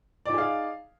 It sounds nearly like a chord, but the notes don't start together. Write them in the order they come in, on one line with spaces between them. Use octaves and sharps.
D5 D#4 G#4 F5